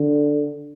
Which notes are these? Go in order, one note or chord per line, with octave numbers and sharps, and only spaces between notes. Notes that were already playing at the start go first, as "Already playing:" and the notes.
Already playing: D3